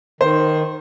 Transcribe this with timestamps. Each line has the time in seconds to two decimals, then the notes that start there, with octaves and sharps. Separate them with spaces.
0.21 D#3 C5